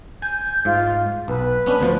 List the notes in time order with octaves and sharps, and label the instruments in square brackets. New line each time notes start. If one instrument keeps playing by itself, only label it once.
[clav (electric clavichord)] G#5 [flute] G6
[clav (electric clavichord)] G#2 [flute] F4
[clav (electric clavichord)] B1 [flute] B4
[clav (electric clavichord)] B3 C#4 D4
D2 F3